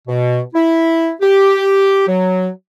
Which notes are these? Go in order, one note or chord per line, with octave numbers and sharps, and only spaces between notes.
B2
E4
G4
F#3